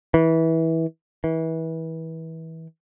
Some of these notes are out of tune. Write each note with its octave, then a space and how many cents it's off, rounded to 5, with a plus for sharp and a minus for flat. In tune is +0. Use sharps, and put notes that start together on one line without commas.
E3 -20
E3 -30